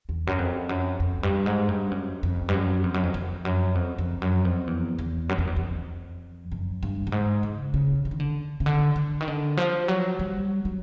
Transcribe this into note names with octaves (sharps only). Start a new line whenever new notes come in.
E2
F#2
F2
F#2
F2
G2
G#2
G2
F#2
F2
G2
F#2
F2
F#2
F2
F2
F#2
F2
F2
F#2
F2
E2
E2
F#2
F2
E2
F2
F#2
G2
G2
G#2
C#3
C#3
D3
D#3
D3
C#3
D3
D3
D#3
D3
F3
F#3
G3
F#3